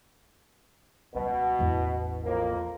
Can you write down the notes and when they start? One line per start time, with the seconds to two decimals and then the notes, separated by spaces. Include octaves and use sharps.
1.15 C#2 B2 G3
1.59 A1 E2
2.25 F2 A#3